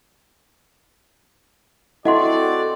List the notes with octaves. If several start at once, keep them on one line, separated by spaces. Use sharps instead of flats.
C4 E4 F#4 A4 D5 D#5 F#5 C6